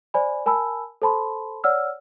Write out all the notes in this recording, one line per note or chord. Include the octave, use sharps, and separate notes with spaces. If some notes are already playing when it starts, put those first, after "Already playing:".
C5 D5 G#5 B5
A#4 G#5 A5 B5 E6
A4 C5 A5 B5 C6
C#5 D5 F#5 E6 F6